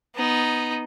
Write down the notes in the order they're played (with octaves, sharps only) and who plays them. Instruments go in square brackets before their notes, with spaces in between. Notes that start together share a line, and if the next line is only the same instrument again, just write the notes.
[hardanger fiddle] B3 D#4